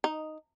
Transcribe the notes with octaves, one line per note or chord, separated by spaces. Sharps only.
D#4